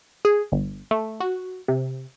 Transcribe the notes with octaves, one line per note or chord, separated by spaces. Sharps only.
G#4
G1
A3
F#4
C3